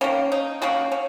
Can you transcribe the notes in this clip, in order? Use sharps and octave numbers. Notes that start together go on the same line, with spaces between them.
D#3 A#3 C#4
D#4
D#3 A#3 C#4 F#4
C#4